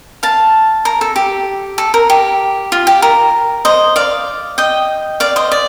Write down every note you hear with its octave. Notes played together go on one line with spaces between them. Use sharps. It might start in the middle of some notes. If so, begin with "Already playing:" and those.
F5 A5
A#4
A4
G4
A4
A#4
G4
F4
G4
A#4
C5 D#5
D5 F5
D#5 G5
D5 F5
C5 D#5
D5